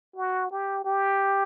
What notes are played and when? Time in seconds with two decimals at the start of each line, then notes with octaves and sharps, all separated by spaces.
0.16 F#4
0.51 G4
0.85 G4